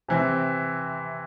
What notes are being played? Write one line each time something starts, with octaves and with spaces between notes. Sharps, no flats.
C3 E3 C4